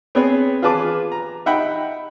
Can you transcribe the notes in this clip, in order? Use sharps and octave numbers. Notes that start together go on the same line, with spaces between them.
B3 C4 G#4 B4 C#5
F4 G#4 B4 A5 D6
A#5
D#4 E5 F#5 G5 B5